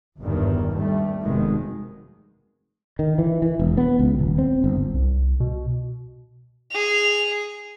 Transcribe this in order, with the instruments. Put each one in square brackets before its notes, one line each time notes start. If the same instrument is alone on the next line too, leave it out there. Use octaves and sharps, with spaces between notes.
[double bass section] G1 E2 G2 D#3
G2 G3 A3
F1 B2 D#3 G#3
[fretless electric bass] D#3
E3
E3
E1
B3
C#2
D#1
C4
G1
[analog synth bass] C2
B2
[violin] G#4 F7